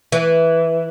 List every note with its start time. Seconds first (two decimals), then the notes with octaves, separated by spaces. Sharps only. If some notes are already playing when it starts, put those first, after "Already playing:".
0.12 E3